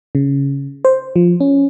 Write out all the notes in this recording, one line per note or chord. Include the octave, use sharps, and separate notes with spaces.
C#3
C5
F3
C#4